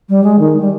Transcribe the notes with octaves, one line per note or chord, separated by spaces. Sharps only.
G3
G#3
D#3
G3